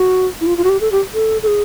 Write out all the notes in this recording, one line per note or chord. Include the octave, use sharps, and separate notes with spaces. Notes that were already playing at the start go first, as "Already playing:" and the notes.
Already playing: F#4
E4
F4
F4
F#4
G4
A4
G4
A4
A4
G#4